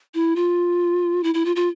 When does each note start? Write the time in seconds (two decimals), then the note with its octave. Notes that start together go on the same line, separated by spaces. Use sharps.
0.15 E4
0.36 F4
1.24 E4
1.34 E4
1.45 F4
1.56 F4